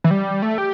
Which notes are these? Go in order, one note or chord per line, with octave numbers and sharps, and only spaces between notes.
E3
G3
A3
G4